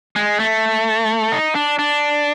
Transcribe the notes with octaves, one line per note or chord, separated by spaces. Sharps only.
G#3
A3
D#4
D4
D4